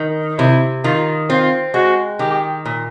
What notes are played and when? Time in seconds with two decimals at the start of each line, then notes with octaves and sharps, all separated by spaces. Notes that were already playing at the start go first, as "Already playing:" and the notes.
Already playing: D#3
0.38 C3 E4
0.84 D#3 F4
1.29 C4 F4
1.74 G#3 F#4
2.19 D#3 G4
2.66 A#2